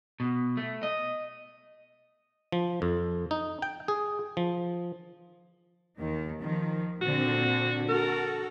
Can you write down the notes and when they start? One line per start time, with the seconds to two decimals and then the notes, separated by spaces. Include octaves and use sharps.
0.20 B2
0.57 A3
0.83 D#5
2.52 F3
2.82 F2
3.31 D#4
3.62 G5
3.88 G#4
4.37 F3
5.98 D#2 D#3
6.40 D#3 F3
7.01 A#2 D3 C4 F#4
7.89 F#4 A4 A#4